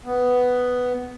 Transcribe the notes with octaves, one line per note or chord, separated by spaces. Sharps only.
B3